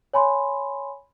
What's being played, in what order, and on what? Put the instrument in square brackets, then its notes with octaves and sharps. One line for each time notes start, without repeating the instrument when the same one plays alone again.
[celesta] C#5 G#5 B5 C6